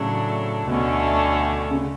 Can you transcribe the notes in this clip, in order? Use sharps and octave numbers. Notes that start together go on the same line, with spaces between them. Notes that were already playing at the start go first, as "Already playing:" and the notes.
Already playing: A2 C#3 F#3 A3 D4
D2 B2 D3 A3 C#4
C#3